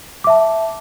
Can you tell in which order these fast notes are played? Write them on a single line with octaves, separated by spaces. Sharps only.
D6 E5 A5